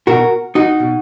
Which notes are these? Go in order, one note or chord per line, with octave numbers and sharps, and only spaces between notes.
B2 F#4 A#4
D#4 F#4
B2